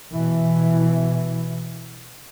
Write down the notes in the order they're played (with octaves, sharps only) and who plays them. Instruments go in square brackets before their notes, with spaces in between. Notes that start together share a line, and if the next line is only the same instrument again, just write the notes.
[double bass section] B2 E3